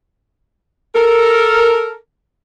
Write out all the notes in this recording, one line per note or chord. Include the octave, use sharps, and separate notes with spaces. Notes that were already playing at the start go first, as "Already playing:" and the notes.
A4 A#4